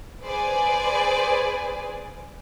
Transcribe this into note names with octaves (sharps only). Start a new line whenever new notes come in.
G#4 B4 C5 D5 G#5